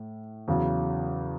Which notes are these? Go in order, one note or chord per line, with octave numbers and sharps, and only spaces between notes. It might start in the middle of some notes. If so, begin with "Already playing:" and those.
Already playing: A2
E2 C#3 F#3